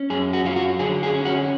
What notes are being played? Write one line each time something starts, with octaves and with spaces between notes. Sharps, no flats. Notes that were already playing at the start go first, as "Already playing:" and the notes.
Already playing: C#4
F#2 G#4
F#4
F#3 F4
F#4
D3 G#4
G#4
C#4
F#4